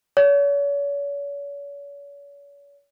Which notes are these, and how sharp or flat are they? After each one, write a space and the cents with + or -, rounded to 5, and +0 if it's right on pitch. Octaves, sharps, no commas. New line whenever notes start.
C#5 +40